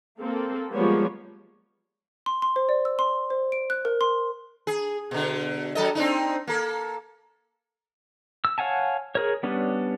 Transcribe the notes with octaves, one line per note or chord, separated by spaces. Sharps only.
A#3 C4 A4
F3 G3 G#3 A#3 B3 C#5
C6
C6
C5
D5
E6
C6
C5
D7
F#6
A#4
C6
G#4
B2 D3
F#3 A4 D#5
C4 D4 D#4
A#3 A4
E6
C#5 F5 F#5 G#5 A5
G#4 A#4 C#5
G3 B3 C#4 D4